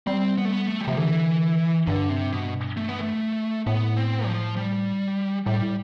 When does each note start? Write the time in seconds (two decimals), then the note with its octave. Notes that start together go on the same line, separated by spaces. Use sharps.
0.07 G3 C4
0.38 B3
0.45 A3
0.52 B3
0.67 A3
0.81 G3
0.88 C3 F3
0.97 D3 E3
1.87 G2 D3
2.09 C3
2.33 B2
2.77 A3
2.89 B3
3.01 A3
3.67 A2 B3
3.97 C4
4.26 F3
4.57 G3
5.46 A2 G3